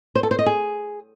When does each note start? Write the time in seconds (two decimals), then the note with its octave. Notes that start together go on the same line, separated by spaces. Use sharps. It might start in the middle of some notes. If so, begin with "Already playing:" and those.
0.15 C5
0.23 A4
0.31 C5
0.39 D#5
0.46 G#4